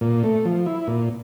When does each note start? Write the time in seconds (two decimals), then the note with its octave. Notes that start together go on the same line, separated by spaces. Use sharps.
0.01 A#2
0.24 A3
0.45 F3
0.66 E4
0.87 A#2